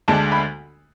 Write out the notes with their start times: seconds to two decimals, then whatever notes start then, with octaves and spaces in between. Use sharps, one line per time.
0.08 D2 D3 G#3 D4 A5
0.32 B5